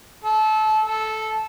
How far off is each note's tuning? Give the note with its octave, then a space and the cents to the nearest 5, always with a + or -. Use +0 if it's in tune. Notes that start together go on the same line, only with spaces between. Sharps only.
A4 -25
A4 -10